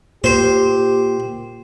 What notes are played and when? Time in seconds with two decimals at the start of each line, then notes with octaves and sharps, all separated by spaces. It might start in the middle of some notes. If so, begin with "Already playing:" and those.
0.24 A#2 G4 C5